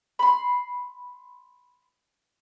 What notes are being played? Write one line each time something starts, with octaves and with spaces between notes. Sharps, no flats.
B5 C6